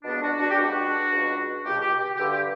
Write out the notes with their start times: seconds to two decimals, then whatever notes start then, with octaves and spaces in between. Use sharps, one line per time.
0.03 C#2 B2 B3 D4
0.21 D4 F#4
0.39 D4 F#4
0.50 G4
0.57 C#2 B2 D4 F#4
1.11 C#2 B2
1.65 C#2 B2 G4
1.81 G4
1.98 G4
2.15 G4
2.19 G2 D3
2.31 G4